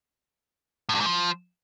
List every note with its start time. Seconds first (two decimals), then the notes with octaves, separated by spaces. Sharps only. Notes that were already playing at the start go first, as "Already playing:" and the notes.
0.89 A2
0.95 G2
1.00 G#2
1.06 F3